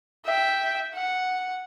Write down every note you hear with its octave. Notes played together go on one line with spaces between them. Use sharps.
E5 G5
F#5